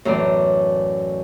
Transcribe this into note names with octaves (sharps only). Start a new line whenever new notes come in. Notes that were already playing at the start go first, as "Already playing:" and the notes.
F#2 A2 E3 D5